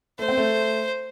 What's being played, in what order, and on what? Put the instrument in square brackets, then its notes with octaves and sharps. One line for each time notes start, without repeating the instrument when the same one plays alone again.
[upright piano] A3 [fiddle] C5
[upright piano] C4
A3